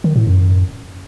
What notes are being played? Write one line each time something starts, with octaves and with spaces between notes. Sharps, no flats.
D#3
A2
F#2